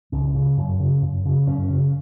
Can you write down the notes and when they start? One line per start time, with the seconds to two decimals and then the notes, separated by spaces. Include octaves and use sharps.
0.12 C#2 C#4
0.34 C#3
0.57 F#2
0.79 C#3
1.02 F#2
1.25 C#3
1.47 F#2 C#4
1.69 C#3